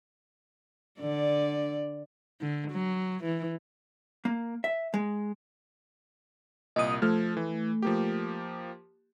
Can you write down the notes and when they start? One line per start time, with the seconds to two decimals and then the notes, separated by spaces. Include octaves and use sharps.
1.00 D3 D5
2.41 D3
2.71 F#3
3.24 E3
4.25 A#3
4.64 E5
4.94 G#3
6.76 C2 A#2 D#5 D#6
7.02 F3 A3 A4 F6
7.37 E3
7.83 F3 A#3 G4